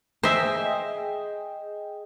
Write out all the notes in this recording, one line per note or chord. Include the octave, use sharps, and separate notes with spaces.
G#4 C5 D#5 E5 G5